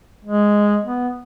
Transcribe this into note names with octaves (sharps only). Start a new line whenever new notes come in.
G#3
B3